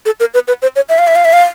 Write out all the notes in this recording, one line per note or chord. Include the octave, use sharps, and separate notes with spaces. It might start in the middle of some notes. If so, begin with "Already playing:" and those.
A4
A#4
B4
B4
C5
C#5
E5
F5
E5
F5
E5
F5